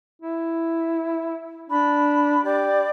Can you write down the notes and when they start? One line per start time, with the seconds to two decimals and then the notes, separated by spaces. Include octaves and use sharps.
0.22 E4
1.70 D4 B5
2.44 G4 D5